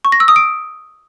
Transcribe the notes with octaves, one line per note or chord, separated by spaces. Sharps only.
C#6
A#6
E6
D#6
D7